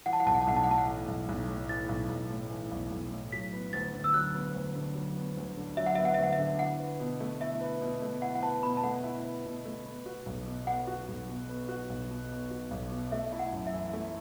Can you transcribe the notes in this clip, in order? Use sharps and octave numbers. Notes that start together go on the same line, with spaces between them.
E3 F#5
A5
F#5
B1 A5
F#5
A5
B1 F#5
A5
F#5
A2 A5
F#5
E3
B1
B1
A2
E3 A6
B1
B1
A2
E3
B1
B1
A2
F#3 B6
B3
D2 A6
D3
E6
F#3 F#6
B3
D2
D3
F#3
B3
D2
D3
F#3 E5
F#5
B3 E5
F#5
D2 E5
F#5
E5
D3
E4 F#5
B4
B2
A3
E4 E5
B4
B2
A3
E4 F#5
F#5
B4 A5
B2 B5
A5
A3 F#5
E4
B4
B2
A3
B3
F#4
B1
B2
B3 F#5
F#4
B1
B2
B3
F#4
B1
B2
B3
F#4
B1
B2
A3 E5
E4
F#5
F#2
E5
E3
A3